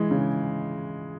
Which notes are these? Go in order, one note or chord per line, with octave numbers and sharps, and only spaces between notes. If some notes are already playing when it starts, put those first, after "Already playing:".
Already playing: E3 G#3
C#3